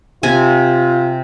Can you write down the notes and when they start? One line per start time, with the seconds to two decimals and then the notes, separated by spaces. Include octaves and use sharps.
0.23 C3 F4 G#5